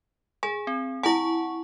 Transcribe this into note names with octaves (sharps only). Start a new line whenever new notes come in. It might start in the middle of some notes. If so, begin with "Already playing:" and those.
G#4 G#5
C4
E4 F#5 G#5 A5 C#6